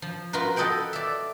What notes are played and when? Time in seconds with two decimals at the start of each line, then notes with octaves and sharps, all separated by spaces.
0.02 F3
0.33 F4 F#4 A#4 B4
0.56 A4 D#5 F#5 G5 B5
0.93 D5 E5